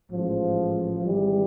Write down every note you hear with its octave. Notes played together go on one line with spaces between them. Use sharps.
A1 G#2 F3
G#1 G#2 E3 G3